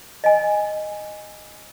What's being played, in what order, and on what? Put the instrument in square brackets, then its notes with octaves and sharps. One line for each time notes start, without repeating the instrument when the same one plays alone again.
[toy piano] D#5 G#5